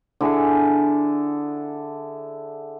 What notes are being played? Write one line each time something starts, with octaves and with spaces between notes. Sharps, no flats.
D3 E4 G#4 A4